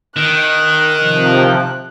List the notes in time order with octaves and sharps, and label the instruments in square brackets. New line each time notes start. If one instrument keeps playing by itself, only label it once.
[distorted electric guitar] D#3 [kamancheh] F#6
[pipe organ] C3 F3